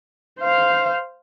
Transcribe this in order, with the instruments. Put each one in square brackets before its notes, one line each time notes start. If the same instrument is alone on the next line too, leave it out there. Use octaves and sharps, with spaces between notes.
[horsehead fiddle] C5 F5